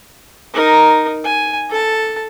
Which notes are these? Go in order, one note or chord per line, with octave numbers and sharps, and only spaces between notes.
D#4 A#4
G#5
A4 A5